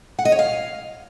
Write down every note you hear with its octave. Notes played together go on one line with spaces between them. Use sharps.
F#5
D#5
C#5
F5